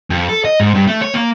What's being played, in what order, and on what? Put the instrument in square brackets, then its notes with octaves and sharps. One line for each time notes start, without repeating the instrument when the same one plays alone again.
[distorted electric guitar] F2
A4
D#5
G#2
G2
A3
C#5
A#3